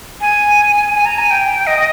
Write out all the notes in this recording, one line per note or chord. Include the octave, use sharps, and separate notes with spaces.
G#5
G#5
A#5
G#5
G5
D#5